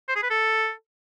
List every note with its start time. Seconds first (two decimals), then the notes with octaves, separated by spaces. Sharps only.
0.08 C5
0.16 G#4
0.23 B4
0.30 A4